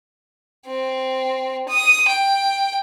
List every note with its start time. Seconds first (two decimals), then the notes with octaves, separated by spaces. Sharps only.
0.67 C4
1.69 D#6
2.08 G5